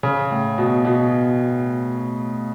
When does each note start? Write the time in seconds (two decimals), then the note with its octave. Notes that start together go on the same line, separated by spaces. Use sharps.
0.03 C#3
0.31 A2
0.58 B2
0.85 B2